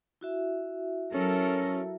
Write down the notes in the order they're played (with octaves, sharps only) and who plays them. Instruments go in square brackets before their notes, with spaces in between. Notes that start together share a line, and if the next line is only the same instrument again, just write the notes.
[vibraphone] E4 F#4 E5
[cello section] F#3 A4 A#4 [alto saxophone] C#4